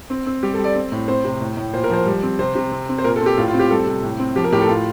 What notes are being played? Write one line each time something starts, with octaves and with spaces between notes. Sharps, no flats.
C4
C4
G3 G4
A4
G3
D5
C4
A2
C4 C5
C3
A2
A2
A#2 C5
A#4
F3 C5
G3
C4
C3 C5
C3
C4
C4
C5
A#2 A#4
A4
C4
G4
A2 F4
F4
C4
G4
G3 A4
C3
A2
C4
F3 G4
A#4
A2 G4
A4
A2 F4